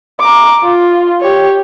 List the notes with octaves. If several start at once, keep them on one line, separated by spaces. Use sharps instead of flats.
A#5 D6
F4
G4 C#5